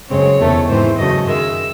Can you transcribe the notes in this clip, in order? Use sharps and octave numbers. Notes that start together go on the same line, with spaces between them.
F#2 C#3 G#3 C4 C#5
E2 C3 D#3 A3
G#2 E3 C4 C5
F#2 C#3 F#3 A3 D#5
F#2 D#3 G#3 E5